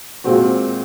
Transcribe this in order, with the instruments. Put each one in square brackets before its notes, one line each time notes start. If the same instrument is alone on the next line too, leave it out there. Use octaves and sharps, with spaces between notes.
[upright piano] A#2 G#3 C4 F#4